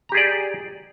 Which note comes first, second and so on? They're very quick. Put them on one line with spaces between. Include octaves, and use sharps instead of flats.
A#5 G4 G#4 D5